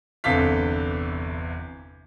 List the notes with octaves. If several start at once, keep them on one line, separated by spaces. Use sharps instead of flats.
G1 E2 C3 A4 F5 B6